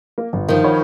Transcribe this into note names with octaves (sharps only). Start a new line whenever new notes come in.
A#3
G1
D#3 F3
C#5 F#5 B5